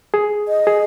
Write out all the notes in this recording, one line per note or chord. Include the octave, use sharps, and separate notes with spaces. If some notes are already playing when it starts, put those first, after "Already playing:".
G#4
D#5
G#4